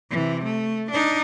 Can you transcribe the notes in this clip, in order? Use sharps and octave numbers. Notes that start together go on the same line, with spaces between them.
C3 E3
A3
D4 D#4